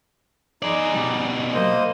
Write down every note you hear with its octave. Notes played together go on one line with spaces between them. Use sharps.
D#4 G#4 D5
B2 G3
A#3 C5 D#5